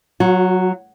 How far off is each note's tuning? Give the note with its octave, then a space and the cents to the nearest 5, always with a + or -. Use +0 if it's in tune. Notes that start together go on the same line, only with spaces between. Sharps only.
F#3 +0 F#4 -40